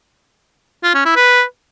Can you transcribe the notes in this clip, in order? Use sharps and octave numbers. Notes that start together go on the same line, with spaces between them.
F4
C#4
E4
B4